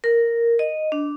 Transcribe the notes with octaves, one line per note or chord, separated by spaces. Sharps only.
A#4
D#5
D4